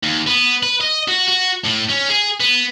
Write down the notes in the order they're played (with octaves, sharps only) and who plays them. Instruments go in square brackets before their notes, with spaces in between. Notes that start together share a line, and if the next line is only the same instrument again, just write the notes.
[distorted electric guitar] D#2
B3
B4
D#5
F#4
F#4
A2
C#4
G#4
B3